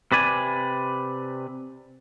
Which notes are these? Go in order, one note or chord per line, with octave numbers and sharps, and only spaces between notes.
C3 B4 D5 G#5